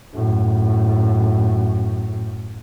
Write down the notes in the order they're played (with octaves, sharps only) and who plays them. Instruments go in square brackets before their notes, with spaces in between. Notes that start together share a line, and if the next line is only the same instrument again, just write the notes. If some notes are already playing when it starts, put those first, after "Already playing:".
[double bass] F#2 A2